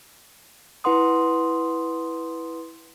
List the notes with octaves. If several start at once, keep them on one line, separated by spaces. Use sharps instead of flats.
E4 B4 F#5 C6 D#6